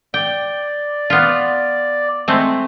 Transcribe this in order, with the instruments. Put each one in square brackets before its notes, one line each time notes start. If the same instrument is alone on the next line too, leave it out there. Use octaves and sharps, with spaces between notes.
[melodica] D5 [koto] G5
[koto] B3 F4
G#3 A3 C4